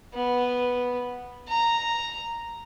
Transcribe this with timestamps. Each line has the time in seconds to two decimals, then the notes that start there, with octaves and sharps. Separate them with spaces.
0.14 B3
1.48 A#5